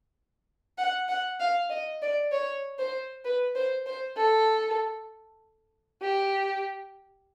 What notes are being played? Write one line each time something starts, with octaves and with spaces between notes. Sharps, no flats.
F#5
F#5
F5
D#5
D5
C#5
C5
B4
C5
C5
A4
G4